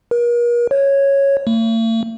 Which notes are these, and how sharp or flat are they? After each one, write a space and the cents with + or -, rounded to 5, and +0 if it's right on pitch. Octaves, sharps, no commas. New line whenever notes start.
A#4 +40
C#5 -5
A3 +45